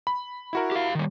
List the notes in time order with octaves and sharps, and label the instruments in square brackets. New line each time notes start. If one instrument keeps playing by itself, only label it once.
[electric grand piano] B5
E4 F#4 A#4
[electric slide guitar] G4 F5
D#3 G3